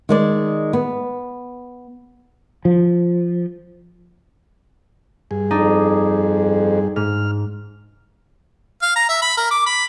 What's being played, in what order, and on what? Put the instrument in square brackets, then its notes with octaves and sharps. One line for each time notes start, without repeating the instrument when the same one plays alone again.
[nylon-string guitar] D#3 G#3 D5
B3
[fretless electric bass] F3
[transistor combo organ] G2 G#4
[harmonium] F2 [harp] D4 D#4
[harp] G#2 [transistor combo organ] F6
[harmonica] F5
A#5
E5
B5
A#4
D6
B5